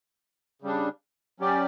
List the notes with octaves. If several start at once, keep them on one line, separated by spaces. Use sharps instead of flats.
C#3 G3 D4
F#3 C#4 G4 D5